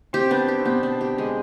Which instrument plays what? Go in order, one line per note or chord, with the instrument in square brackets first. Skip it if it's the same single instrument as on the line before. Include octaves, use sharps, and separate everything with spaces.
[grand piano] C4 C5 [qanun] G4
[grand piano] B3 B4 [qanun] D4
[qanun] G4
[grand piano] C4
[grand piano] B2 B3 [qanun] G4
[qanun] D4
G4
G#3